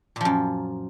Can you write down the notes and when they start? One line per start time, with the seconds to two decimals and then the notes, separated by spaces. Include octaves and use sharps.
0.16 A#2
0.21 F3
0.25 F#2